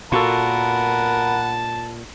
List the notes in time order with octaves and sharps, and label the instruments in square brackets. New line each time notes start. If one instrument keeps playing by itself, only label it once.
[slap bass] A#2 [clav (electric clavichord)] F4 F#4 A4 [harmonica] A#4 F#5 B5 [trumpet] A5